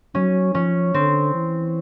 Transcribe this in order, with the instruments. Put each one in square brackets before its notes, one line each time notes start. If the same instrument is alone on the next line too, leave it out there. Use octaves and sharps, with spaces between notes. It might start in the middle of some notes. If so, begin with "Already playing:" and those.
[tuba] F#3 [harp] C#4
[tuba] F3 [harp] C#4
[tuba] D3 [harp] C4
[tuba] E3